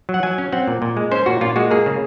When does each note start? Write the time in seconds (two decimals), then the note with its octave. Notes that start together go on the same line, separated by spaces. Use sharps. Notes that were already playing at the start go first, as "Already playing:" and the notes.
0.09 F#3
0.14 F#5
0.23 F#3 G#5
0.38 C#4
0.53 C4 F#5
0.67 A#2
0.82 A#2
0.97 G#3
1.11 C#4 C5
1.26 A#2 F#4
1.41 A#2 F4
1.56 G#3 F#4
1.71 A#3 G#4
1.86 C#3